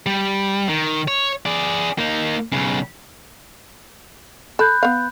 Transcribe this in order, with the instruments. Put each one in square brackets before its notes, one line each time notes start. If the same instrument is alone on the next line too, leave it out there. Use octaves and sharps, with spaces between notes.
[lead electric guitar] G3
D#3
C#5
G#4 D5
A#3 D#4
B1 C#3
[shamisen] A4 [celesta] B5 F#6 G6
[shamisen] B3 F5